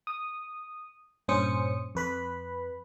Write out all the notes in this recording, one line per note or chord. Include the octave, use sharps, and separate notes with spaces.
D#6
G2 A#2 C#4 C5 D#6 C#7
F2 B4 B5